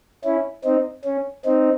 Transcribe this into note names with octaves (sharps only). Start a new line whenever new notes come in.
C#4 E4
C4 D#4
C#4
C4 D#4